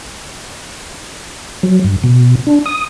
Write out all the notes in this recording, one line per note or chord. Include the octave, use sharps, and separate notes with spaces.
F#3
G2
B2
D4
D#6